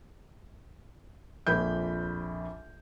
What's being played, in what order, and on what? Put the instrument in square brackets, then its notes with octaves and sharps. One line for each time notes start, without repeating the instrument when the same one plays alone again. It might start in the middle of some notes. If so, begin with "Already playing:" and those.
[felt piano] A#1 F2 B5 G6